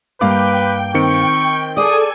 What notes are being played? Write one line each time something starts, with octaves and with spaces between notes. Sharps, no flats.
G2 A#3 B4 F5 G5 D6
D#3 C4 C#6 C#7
G#4 A4 D5 G#5 D#6